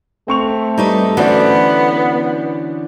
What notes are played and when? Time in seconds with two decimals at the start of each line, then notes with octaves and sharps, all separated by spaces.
0.28 A3 C4 C#6 F7
0.78 G3 C4 D#4 B4
1.17 D3 E3 B3 C#4 F#4 C5 D5